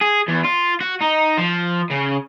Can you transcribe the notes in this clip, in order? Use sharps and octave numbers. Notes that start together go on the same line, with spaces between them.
G#4
E2
F4
F#4
D#4
F3
C#3